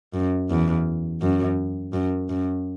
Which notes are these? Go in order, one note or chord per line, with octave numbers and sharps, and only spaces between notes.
F#2
E2
F#2
F#2
F#2